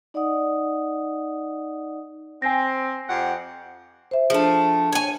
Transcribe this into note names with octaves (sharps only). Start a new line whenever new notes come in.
D#4 D5 D#5 F#5 D#6
C4 G#5 A#6
F2 G4 F#5
C5 E5
F3 A3 D4 G#4
C#5 G#5